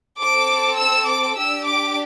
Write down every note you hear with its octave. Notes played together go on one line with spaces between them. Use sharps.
C4 A4 D6
E6
D6
D4 G4 E6
D6